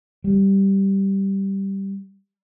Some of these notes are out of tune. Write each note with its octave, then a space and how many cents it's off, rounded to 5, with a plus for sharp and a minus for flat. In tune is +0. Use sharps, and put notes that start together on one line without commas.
G3 -5